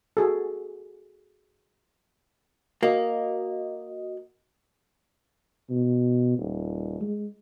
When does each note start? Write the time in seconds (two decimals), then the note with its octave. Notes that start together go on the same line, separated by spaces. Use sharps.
0.17 F#4 G#4 A4
2.83 A#3 F#4 D#5
5.70 B2
6.38 D#1
7.01 G#3